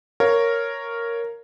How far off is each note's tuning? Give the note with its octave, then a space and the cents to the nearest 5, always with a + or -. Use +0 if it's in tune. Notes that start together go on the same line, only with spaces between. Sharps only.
A#4 -5 C#5 +0 F5 +0